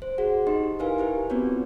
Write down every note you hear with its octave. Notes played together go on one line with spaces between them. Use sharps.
C5
F#4 G#4 F#5
D#4 G4 D#5 C6
D#4 E4 A#4 B4 F5 G#5
E4 G4 B4
B3 C4 F4 F#4 B4 C#5